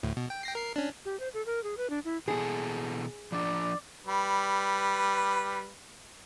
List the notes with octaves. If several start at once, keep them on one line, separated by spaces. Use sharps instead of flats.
D2 A2
B2
G5
G5 A#6 C7
A#4 C7
C#4 D4
G4
C5
A4
A#4
G#4
B4
D4
E4
B2 E3 G#4 A4
F3 D4 D5
G3 B4